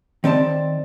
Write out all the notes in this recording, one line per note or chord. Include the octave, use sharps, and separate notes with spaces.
D#3 C4 D5 A5